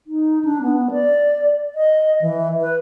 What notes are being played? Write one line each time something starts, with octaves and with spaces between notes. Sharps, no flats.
D#4
D4
B3
D5
D#5
E3
B4